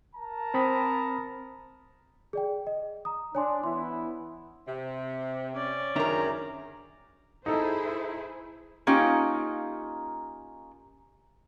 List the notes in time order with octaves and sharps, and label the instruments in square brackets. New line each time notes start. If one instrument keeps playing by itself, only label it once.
[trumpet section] A#4 A5 A#5
[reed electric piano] C4 B5 D#6
[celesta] G#4 D5 G5
D#5
A#5 D#6
[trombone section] D4 [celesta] C#5 G#5 C6
[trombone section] E3 B3 E4 [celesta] C6
[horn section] C3
[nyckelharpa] C#4 D5
[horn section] F#2 G#4 A#5 [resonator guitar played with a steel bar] D#3 A#4 [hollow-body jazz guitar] D4 E5
[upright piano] D#4 A4 [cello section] E4 G#4 C5
[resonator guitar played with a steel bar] A#3 C#4 D#4 F4 G4